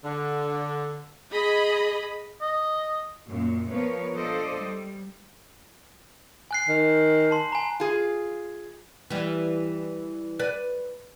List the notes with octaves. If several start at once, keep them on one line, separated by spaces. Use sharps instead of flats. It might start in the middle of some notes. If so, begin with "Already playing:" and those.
D3
G#4 D#5 B5
D#5
F#2 A#2
F3 B3 A#4 B4 C#5
F3 D4 A4 C5 D5 D#5
G3
G#5 F#6 C7
D#3
A5 C6
G#5 A#5
F4 G#4
E3 G3
B4 D5